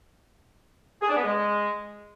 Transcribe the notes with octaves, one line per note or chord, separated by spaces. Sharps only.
G#4
D4
B3
G#3